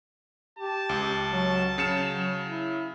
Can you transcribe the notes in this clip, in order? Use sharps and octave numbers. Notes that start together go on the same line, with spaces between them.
G4 A5
C#2
F#3
C#3 F#3 C#7 E7
F#3
E4